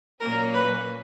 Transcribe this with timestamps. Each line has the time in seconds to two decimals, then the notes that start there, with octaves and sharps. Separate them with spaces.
0.20 A#2 F#3 A#3 C#4 A#4
0.54 B4